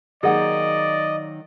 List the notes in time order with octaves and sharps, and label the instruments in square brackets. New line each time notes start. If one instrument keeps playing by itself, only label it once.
[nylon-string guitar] D#3 F#3 A#3 [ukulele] G#4 F#5 [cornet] D5 [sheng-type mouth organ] D#5